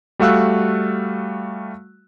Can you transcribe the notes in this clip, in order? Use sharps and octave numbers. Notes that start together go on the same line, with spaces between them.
G3 A3 F#4 F5 E6 F#6